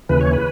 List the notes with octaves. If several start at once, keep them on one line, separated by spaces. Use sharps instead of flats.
D#2 C#3 E3 B4
C#5
B4